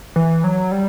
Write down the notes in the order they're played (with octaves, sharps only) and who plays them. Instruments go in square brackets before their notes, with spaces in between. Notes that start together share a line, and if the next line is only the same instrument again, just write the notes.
[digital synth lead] E3
F#3
G3